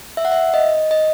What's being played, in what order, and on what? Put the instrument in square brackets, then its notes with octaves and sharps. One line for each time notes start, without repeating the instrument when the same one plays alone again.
[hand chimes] E5
F#5
E5
D#5
D#5